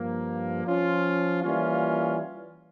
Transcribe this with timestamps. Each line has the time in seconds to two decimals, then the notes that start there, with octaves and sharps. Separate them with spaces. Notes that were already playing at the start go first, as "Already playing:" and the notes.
Already playing: G2 F3 A#3
0.66 F3 C#4 F4
1.43 E3 G3 A#3 C#4 F4